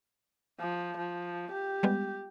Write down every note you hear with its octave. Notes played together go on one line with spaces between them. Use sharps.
F3
F3
G4
G3 G#3 B3